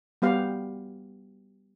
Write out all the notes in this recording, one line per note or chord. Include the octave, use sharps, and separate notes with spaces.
G3 B3 G4 F5